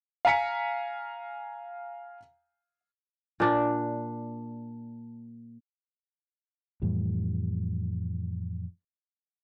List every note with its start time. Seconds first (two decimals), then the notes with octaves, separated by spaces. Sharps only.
0.25 F5 G#5 A#5 B6 C#7
3.40 A#2 D4
6.82 F2 A2 E3 G3